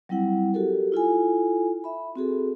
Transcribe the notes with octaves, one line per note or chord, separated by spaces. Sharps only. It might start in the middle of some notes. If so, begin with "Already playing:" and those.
F#3 G3 C4 E4 F#5
F#4 G4 A4 A#4
E4 F4 A4 G#5
E5 B5
C4 F#4 G#4 A4